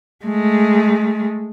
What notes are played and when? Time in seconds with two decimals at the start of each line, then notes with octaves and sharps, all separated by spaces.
0.25 G#3 A3